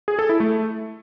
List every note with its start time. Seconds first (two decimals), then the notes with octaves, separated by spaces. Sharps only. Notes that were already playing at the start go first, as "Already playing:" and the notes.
0.08 G#4
0.19 A4
0.29 E4
0.40 A3